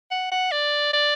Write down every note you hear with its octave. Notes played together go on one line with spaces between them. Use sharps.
F#5
F#5
D5
D5